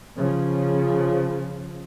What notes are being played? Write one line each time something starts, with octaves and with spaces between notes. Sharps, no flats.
C#3 F3